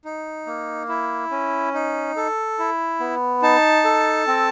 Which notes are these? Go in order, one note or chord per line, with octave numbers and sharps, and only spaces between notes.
D#4
A#3
E4
C#4
D#4
A4
E4
B3
D#4 A5
A4
C4